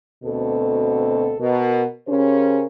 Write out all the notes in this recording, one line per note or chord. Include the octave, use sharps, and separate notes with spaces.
D2 B2 C4 A4
B2 A#4
C#3 C#4 G4 A#4 C5